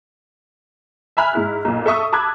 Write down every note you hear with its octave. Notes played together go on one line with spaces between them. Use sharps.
E5 G#5 B5 F6 F#6
G#2 E4 F6
B1 A#2
A4 E5 C#6 D#6
A5 B5 D6 E6 F#6 G#6